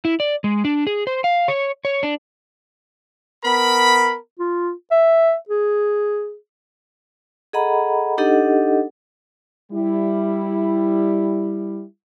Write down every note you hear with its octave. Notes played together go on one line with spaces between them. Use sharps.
E4
D5
G#3
D4
G#4
C5
F5
C#5
C#5
D4
B3 A#4 B5
F4
E5
G#4
G#4 A4 D#5 F#5 A#5 B5
D4 D#4 G4 A4 D#5 F#5
G3 E4